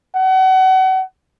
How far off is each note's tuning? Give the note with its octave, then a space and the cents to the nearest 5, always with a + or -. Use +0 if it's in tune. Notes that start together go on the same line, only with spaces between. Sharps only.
F#5 +35